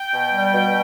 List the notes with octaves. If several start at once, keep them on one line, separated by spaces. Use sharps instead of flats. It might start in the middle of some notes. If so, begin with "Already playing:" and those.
Already playing: G5
B2
G3
B2